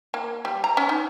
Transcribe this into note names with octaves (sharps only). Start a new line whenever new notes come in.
A#3
G3
A#5
C#4
D#4